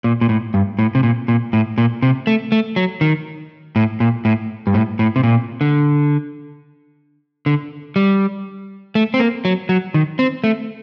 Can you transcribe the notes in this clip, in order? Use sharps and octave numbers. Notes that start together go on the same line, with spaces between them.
A#2
A#2
A2
G2
A2
C3
A#2
A#2
A2
A#2
C3
A3
A3
F#3
D#3
A2
A#2
A2
G2
A2
A2
C3
A#2
D3
D3
G3
A3
C4
A#3
F#3
F#3
D#3
C4
A3